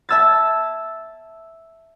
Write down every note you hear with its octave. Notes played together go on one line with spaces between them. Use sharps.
E5 A5 E6 G#6 A6